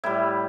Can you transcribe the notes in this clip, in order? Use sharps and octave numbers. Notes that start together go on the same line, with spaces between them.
A2 G3 E4